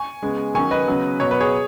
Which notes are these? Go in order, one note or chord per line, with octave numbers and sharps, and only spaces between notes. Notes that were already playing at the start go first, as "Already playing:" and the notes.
Already playing: G#5 C#6
C#3 G#3 B3
D#3 F#3 C#4 G#5 C#6
B4 D#5
C#3 F#3 B3
B2 F#3 B3 C#5
B4
G#4 C#5